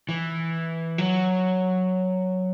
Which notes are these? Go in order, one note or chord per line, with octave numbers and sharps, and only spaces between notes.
E3
F#3